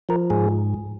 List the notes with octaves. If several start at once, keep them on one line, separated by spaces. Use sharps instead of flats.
F3 A#4
G#2 G#4